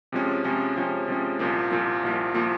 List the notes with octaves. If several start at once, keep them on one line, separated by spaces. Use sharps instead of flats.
C3 F3 G#3 C#4
C3 F3 G#3 C#4
C3 F3 G#3 C#4
C3 F3 G#3 C#4
C2 A#2 F3 A#3
C2 A#2 F3 A#3
C2 A#2 F3 A#3
A#2 F3 A#3